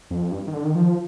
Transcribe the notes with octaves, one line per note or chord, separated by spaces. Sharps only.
F2
G2
D#3
D3
D#3
F3